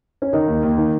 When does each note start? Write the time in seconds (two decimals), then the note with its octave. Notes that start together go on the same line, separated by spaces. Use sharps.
0.22 C#4
0.33 D#3 D#4
0.48 D#2
0.63 D#2
0.78 D#3